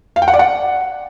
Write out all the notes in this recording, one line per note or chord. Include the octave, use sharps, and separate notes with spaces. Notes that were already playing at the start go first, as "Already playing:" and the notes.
F5
G5
F#5
D5
F#5